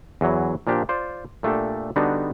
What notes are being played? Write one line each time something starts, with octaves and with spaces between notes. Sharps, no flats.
E2 E3 F#3
A#2 F3 A#3 D4 G4
F4 C5 D5
A#2 A3 D4 G4 A4
D3 G3 B3 D4 D#4 F#4